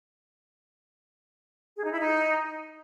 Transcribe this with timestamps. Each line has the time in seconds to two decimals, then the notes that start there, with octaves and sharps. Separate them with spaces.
1.76 G#4
1.84 D#4
1.92 E4
2.00 D#4